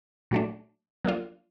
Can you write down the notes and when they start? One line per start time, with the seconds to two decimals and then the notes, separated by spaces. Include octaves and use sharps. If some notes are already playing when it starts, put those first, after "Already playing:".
0.31 A#2 F#3 A3 D4
1.05 F#3 A#3 D4 F4